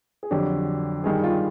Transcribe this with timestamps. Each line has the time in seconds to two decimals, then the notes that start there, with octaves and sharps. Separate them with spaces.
0.23 G#4
0.31 F2 D3 F#3 G4
1.04 G2 D#3 G3 G#4
1.24 F4